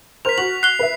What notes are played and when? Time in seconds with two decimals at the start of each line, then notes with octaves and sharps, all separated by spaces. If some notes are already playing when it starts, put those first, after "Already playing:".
0.25 A#4 C5 F6 B6 F7
0.38 F#4 F#7
0.63 F#6 C7 G7
0.79 B4 E5